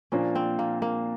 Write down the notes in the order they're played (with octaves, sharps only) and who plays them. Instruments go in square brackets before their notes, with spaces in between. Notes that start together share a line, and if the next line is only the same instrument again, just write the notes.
[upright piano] A#2 F3 A#3 D4 [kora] C#4
[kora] C4
A#3
A#3